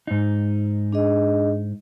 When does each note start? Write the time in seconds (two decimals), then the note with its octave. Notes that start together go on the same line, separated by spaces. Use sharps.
0.07 G#2 D#4
0.92 D4 G#4 D#5